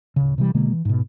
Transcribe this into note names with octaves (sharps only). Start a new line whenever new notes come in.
D1 C#3
C3 E3 G3
B2 D3 G#3 A#3
E3
G#2 B2